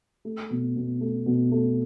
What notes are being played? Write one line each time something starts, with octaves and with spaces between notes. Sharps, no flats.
A3
B2
B2
A3
B2
A3